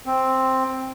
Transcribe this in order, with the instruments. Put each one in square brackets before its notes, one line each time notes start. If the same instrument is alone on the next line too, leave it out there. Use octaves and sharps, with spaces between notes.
[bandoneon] C4